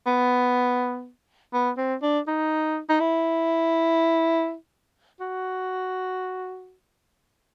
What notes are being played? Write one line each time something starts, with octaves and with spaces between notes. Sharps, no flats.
B3
B3
C4
D4
D#4
D#4
E4
F#4